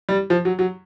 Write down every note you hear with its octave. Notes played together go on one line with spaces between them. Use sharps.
G3
F3
F#3
F#3